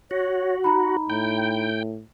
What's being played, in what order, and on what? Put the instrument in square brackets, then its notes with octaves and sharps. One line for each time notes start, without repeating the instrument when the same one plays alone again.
[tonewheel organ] F#4 [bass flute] C#5
[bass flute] D#4 [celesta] A#5 B5
[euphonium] A2 [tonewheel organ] G5